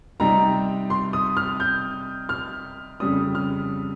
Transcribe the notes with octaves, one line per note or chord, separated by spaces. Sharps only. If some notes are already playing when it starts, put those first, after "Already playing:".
C3 G3 C4 D#4 A#5
C6
D#6
F6
G6
F6
F2 C#3 G3 C#4 D#6
F6